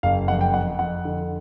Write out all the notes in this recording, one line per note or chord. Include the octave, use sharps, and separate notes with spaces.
F#1 F5
F2 F#5
G5
F2 F#5
F2 F#5
D3